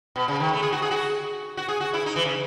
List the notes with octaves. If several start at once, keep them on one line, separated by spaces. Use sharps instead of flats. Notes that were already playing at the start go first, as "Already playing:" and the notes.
B2
C#3
D#3
A3
G#4
F#4
G#4
F#4
F#4
G#4
F#4
E4
D#4
E3
C#3